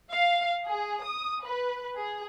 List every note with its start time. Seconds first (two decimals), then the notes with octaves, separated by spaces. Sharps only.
0.11 F5
0.67 G#4
1.02 D#6
1.45 B4
1.96 G#4